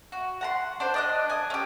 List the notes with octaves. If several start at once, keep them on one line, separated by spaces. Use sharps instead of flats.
F#4
F#5 A#5 C6
D4 C5
D4 D#5 F#6
G#5 D#6
C#4 G4